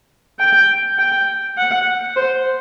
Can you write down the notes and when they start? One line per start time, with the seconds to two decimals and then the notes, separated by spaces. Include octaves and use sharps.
0.39 G5
0.98 G5
1.58 F#5
2.16 C5